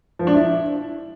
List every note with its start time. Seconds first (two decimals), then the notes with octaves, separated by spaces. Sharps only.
0.19 F3
0.27 D4
0.35 E4